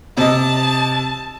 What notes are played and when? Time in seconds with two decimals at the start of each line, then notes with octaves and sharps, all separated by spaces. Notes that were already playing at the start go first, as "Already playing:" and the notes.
0.17 C3 D#5 A5